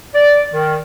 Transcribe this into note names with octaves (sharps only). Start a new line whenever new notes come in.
D5
D#3